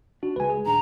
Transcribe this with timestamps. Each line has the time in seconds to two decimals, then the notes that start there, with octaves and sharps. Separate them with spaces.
0.23 D4 F#4
0.36 C#2 G#3 B4 G#5
0.50 G#4
0.66 D#1 D4 A#5